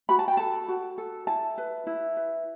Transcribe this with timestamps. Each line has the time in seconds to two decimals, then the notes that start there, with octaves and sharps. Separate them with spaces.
0.09 F#4 B5
0.19 A5
0.28 G5
0.37 A4 A5
0.68 F#4
0.98 A4
1.27 E4 A5
1.58 B4
1.87 E4
2.16 B4